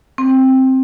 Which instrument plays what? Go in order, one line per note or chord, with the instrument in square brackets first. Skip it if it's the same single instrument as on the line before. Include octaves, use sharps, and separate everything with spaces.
[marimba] C4